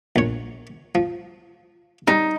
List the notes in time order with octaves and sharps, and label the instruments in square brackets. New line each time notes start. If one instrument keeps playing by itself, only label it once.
[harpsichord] A#1 C#5
F3
[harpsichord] G3 [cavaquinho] D#4